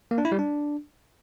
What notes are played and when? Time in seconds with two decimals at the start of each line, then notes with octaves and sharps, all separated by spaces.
0.11 A#3
0.18 D4
0.25 E4
0.32 G3
0.39 D4